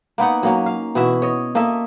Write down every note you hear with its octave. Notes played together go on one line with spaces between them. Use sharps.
A#3 B3 D#4 F#5
F#3 A#3 C#4
F5
B2 E3 F#4 E5
C#5 D#5
A#3 A4 D#5 E5